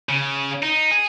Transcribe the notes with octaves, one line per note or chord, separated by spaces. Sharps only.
C#3
D#4
G#4